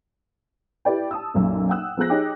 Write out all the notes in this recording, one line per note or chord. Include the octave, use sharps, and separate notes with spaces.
E4 G4 B4 D5 G5
A5 D#6 E6
B1 F#2 A#2
F#5 G5 D#6 E6 F#6
F3 B3 G#4 A#5 F#6 A#6
D#4 G4 G#4 C#5 G5 D6